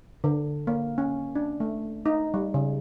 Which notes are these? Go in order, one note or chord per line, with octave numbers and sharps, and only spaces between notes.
D3
A#3
C#4
D4
A3
D#4
G3
C#3